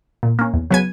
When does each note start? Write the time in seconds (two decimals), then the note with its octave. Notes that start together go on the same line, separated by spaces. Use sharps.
0.23 A#2
0.39 A#3 C#4
0.54 E2
0.70 C#3 F#3 B3 G#5